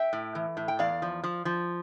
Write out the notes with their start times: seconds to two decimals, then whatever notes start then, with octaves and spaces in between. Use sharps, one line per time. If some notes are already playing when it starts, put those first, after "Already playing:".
Already playing: E5 G5
0.13 A2
0.35 E3
0.57 A2
0.68 G5
0.79 E2 D5 F5
1.02 F3
1.23 F3
1.45 F3